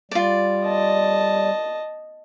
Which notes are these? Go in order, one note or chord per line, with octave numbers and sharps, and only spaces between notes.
G3 F4 D5
D#5 A5